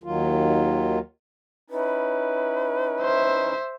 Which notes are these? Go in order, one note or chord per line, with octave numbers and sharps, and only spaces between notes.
D#2 D#3 F#3 F4
C#4 D#4 E4 B4
C5 E5